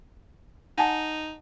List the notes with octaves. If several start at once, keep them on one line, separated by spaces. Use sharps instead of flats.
D#4 F#5 G#5 A5